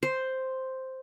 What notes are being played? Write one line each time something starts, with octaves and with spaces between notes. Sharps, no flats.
C5